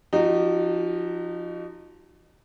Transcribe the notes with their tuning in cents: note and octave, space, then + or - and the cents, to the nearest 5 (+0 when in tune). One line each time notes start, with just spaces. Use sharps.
F3 +0 D#4 -20 F#4 +40